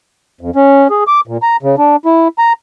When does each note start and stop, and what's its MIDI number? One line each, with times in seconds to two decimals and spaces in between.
0.41 0.50 41
0.56 0.88 61
0.90 1.04 68
1.07 1.21 86
1.27 1.37 46
1.43 1.56 82
1.63 1.75 49
1.78 1.96 62
2.05 2.28 64
2.38 2.53 82